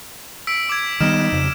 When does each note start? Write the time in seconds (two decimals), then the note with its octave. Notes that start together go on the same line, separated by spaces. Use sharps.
0.47 E6 B6 D7
0.69 D6 G#6
1.00 D#3 G3 B3 D#4 F6 D7 E7
1.32 F2 C#3